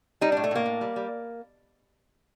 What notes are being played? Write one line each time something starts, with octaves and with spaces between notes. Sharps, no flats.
G3 D#4
A2 D4
A3
A2 A#3
A2
G3
G3